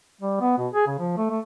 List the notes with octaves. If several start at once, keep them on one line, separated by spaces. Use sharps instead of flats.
G3
B3
B2
G#4
C#3
F3
A3
A3